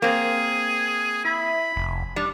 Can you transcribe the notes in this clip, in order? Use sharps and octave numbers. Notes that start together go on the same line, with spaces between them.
A#3 C4 G#4
E4 B5
F1
G3 D4